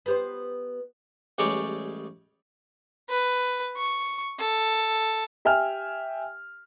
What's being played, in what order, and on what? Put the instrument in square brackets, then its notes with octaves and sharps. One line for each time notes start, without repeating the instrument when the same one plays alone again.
[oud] B3 G4 C5
[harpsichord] A1 G3 G#3 G#4 C#5 D5
[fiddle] B4
C#6
A4
[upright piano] G4 E5 G5 G#5 F6